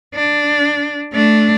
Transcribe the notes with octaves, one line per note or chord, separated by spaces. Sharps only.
D4
A3 D4